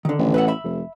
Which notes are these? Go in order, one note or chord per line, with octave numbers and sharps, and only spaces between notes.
D3 D#3
A1
B4 E5 F#5
E5 B5
F1